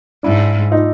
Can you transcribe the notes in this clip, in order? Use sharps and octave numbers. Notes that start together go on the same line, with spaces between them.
G#2 D4 E4
D#4 F4